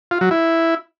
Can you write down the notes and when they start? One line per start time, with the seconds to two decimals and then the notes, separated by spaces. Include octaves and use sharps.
0.11 F4
0.21 F#3
0.31 E4